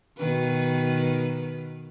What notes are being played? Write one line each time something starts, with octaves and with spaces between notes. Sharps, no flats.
B2 D#3 B4